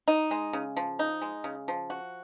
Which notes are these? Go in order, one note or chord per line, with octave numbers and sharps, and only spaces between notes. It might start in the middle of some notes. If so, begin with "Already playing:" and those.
D#4
G#3
C#3
F3
D#4
G#3
C#3
F3
F#4